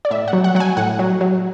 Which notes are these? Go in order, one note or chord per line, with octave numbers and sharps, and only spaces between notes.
D5
A2 E5
F#5
F#3
F#5
F#3 F#5
G#5
A2 F#5
F#3
F#3